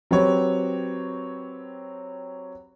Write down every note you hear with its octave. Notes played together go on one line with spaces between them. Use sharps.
F#3 C4 G4 B4 C#5